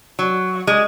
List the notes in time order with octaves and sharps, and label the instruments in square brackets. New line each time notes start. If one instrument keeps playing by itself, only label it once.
[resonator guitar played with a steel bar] F#3
G#3